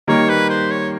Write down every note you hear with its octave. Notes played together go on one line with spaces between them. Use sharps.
D#3 G3 A#3 C#5
B4
C5
C#5